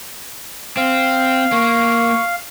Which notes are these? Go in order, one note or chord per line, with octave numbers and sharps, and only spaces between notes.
C4 F5
A#3 C#6